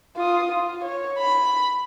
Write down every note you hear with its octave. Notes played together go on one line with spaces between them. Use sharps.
F4 D#6
F4
C#5
B5